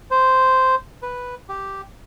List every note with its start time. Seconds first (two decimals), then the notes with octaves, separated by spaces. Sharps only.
0.11 C5
1.03 B4
1.49 G4